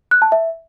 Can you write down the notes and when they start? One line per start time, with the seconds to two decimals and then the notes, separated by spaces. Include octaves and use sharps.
0.11 F#6
0.22 A5
0.32 E5